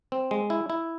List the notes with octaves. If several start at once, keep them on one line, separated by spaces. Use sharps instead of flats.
C4
G#3
E4
E4